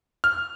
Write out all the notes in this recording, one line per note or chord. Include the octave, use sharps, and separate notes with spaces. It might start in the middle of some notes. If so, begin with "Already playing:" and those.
F6